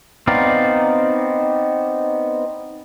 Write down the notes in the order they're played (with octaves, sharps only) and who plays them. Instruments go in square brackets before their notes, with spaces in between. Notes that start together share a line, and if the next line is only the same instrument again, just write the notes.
[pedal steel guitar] B3 C4 D#4 D5 F5